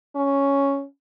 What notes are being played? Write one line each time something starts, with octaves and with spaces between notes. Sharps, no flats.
C#4